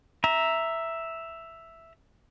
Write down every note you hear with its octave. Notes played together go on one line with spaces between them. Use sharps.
E5 A#5